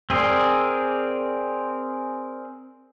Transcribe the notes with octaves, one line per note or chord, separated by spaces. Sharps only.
C4 G#4 A#4 D5 C6